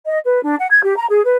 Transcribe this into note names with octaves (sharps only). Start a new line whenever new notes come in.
D#5
B4
D4
F#5
G#6
G4
A#5
G#4
B4